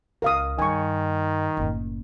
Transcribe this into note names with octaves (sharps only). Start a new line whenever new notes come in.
C#2 A#4 F5 D#6
G2 D#3 G#5 C#6
F#1 A2